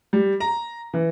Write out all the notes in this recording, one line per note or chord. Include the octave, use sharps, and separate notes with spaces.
G3
A#5
E3